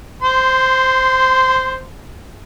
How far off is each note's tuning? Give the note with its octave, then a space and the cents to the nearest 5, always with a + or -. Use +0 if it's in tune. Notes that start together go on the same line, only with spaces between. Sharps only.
C5 +0 C6 -20